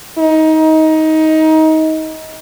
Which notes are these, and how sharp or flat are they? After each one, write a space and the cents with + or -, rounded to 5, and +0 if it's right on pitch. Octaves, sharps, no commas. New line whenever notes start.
D#4 +20